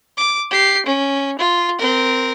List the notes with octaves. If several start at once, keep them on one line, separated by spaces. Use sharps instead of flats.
D6
G4 C7
C#4
F4
C4 A#4